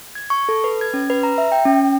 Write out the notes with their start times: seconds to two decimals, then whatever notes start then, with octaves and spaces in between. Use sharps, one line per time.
0.15 G#6
0.30 C#6
0.49 A4
0.64 B4
0.81 G#6
0.94 C#4
1.10 B4
1.23 A#5
1.38 E5
1.52 G5
1.65 C#4
1.81 G5